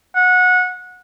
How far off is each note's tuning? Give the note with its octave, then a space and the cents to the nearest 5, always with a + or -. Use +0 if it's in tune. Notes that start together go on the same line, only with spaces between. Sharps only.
F#5 -20